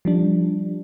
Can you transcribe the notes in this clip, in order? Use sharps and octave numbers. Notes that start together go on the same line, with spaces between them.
F3 G3 D4